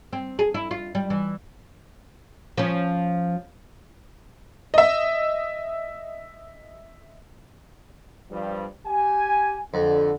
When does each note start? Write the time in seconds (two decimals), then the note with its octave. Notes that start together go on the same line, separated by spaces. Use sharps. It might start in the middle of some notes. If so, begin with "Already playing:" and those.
0.13 C4
0.39 G#4
0.54 E4
0.71 F4
0.95 G3
1.10 E3
2.57 F3 C#4
4.74 D#5 E5
8.31 G2 F3 G3
8.86 G4 G#5
9.74 F2 D3